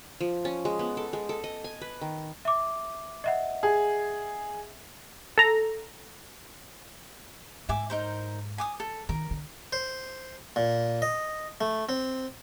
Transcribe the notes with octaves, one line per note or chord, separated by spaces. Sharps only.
F3
C#4
G#3
B3
A4
G#3
A4
D#5
G#5
B4
D#3
E5 D6
D#5 E5 F#5
G#4
A4 A#5
G#2 E5 G#5 D6
D#4 A#4 C5
G#5 D6 D#6
A4
D#3 A#4
D3
C5
A#2
D#5
A3
C4